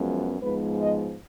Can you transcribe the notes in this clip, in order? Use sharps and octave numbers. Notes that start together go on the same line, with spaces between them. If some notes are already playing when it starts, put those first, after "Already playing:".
Already playing: F#2 F3 G#3 B3
G#2 F3 G#3 B3 B4
D#5